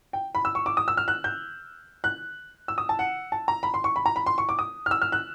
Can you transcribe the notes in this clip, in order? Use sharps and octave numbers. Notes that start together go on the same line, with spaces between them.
G5
B5
E6
C#6
D6
D#6
E6
F6
F#6
G6
F#6
E6
D#6
A5
F#5
A5
A#5
B5
C6
C#6
B5
A#5
B5
C6
C#6
D6
D#6
F6
E6
F6
F#6